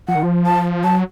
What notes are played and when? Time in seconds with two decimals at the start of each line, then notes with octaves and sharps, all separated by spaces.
0.08 F3 F#5
0.15 D#3
0.23 F3
0.46 A5
0.84 F#3 A5